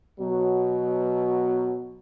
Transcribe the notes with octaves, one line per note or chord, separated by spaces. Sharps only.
B2 F#3